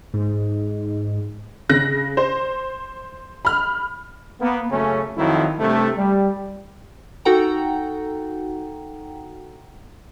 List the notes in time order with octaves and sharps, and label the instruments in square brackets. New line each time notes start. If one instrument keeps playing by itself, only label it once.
[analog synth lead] G#2
[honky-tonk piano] C#3 F#6 A#6
C5
B5 F6
[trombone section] A#3 B3
F#2 C#3 A3 C#4
F2 D#3 F3 F#3 E4
G2 C3 A3
G3
[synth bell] D#4 F#4 A4 F#5 G5 A#5